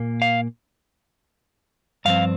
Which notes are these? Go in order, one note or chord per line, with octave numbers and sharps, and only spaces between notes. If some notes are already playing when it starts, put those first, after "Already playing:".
Already playing: A#2 A#3
F5
G2 F3 C4 F5